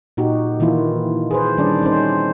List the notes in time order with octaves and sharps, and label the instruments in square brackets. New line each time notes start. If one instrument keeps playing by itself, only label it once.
[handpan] A#2 D#4 F#4 G4
D#3 E3 A#3 E4 F4
G#4 B4 C5
D#3 G3 C#4 D4 D5
C4 C#4 D#4 C5